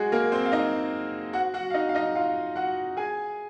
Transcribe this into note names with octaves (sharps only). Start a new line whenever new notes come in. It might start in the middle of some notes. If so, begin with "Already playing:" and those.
Already playing: G#3 F#4 G#4
A#3 A#4
C4 C5
F5
D#4 D#5
F#4 F#5
F#4 F#5
F5
D#4 D#5
F5
D#4 D#5
F4 F5
F#4 F#5
G#4 G#5